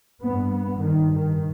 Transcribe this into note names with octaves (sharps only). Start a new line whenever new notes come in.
G2 B3
B3
G2 D#3
D#3